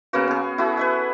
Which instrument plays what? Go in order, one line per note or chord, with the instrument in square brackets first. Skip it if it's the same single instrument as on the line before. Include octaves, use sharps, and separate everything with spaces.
[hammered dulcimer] C#3 A#3 B3 F#4
B3 G#4
E4 F#4 G#4 A4
B4 E5 F#5